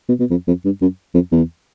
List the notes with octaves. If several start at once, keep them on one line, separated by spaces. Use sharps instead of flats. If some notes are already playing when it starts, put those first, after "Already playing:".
B2
B2
F2
F2
G2
F#2
F2
E2